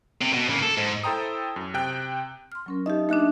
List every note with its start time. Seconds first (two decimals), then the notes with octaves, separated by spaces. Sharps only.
0.21 C3
0.33 B2
0.49 C#3 A#3
0.62 A4
0.78 G#2
1.04 E4 A4 C5 G5 A#5 D#6
1.56 F#2
1.74 C3 G5 F#6
2.52 C6 F6
2.66 F#3 C#4 A#4
2.86 D#4 G4 D#5 E5
3.09 A#3 D4 D#4 E5 F#6